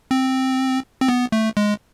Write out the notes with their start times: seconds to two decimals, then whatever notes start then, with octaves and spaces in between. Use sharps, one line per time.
0.11 C4
1.01 C4
1.08 B3
1.32 A3
1.57 G#3